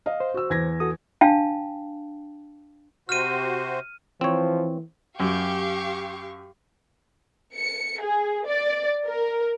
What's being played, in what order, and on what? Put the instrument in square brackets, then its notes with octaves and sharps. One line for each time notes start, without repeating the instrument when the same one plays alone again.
[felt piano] D#5 F5
[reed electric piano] C5
[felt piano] F#4 E6
E2 G#6 A#6
[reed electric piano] F#4 A4 D#6
[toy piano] D4 F5 G5 A5
[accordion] C3 F#4 C5 [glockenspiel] F6 D#7
[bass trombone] E3 [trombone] F3 [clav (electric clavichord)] C4 C#5
[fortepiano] F#2 [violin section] G4 F5 C#6
[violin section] C#7
G#4
D5
A#4